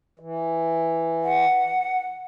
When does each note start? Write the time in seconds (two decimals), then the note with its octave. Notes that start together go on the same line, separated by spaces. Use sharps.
0.19 E3
1.24 F#5